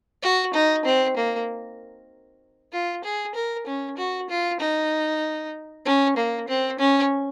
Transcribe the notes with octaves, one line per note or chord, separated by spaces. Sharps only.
F#4
D#4
C4
A#3
F4
G#4
A#4
C#4
F#4
F4
D#4
C#4
A#3
C4
C#4